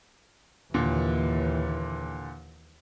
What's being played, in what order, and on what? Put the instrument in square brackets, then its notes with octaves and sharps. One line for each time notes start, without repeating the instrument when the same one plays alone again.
[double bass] D#2 E3 [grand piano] A#2 D3